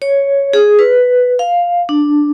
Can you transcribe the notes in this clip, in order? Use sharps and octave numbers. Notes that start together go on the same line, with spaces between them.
C#5
G#4
B4
F5
D4